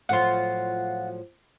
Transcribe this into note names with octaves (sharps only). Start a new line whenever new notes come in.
A2 F3 F#3 F4 F#5